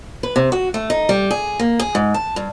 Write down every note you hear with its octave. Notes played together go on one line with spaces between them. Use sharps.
B4
C3
F#4
A3
D#4
G3
G#4
A#3
G#4
G#2
A5
G2